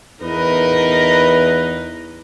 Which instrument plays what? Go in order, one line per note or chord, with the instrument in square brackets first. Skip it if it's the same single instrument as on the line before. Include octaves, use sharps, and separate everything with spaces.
[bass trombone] E2 [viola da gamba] D#4 A#4 D#5 [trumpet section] B4